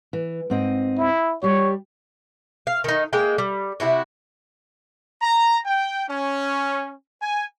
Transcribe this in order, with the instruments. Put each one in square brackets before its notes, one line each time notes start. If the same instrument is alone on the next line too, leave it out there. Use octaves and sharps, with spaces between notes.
[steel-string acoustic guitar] E3
G#2 C4 D#5
[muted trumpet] E4
[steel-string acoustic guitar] G3 G4 [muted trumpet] C#5
[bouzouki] F5
D#3 D#4
G#3 A#3 G5
G3
C3 E4 F#4
[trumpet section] A#5
G5
C#4
G#5